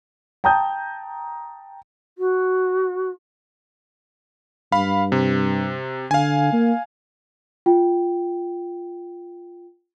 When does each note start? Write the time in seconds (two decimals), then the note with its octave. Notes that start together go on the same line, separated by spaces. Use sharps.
0.44 G5 A5 A#5 D#6 G6
2.18 F#4
4.72 G2 F5 B5
5.12 C3
6.11 D3 F5 G#5
6.53 A#3
7.66 F4 G5